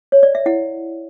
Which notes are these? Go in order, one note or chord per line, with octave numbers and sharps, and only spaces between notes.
C#5
D5
E5
E4 F#5